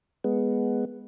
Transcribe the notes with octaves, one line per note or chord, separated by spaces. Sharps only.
G#3 B3